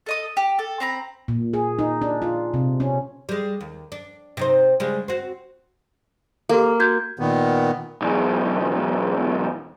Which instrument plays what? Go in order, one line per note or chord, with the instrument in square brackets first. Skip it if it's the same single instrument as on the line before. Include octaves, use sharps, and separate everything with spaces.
[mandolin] A4 D#5 D#6
G4
A4
C4 A#5 B5
[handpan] A#2
G#4
D#4
D4
F4
C3
C#4
[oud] G3 G#3
D#2
D4
C3 D#4 C5
C#3 G3 G#3
C4 F#4
[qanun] A#3 [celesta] G4 A4
[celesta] F#4 G6 G#6
[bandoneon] A#2 D#3 B3
[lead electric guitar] B1 E2